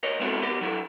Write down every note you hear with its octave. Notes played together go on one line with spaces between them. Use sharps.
A#4 C#5 D#5
G#3 B3 C4 E4 F#4 A4
B3 G4 A#4
F#3 E4 A4